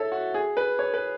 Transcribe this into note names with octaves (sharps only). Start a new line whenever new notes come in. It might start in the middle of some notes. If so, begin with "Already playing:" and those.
Already playing: A4 C#5 E5
F#4
G#4
B4
C#5
B4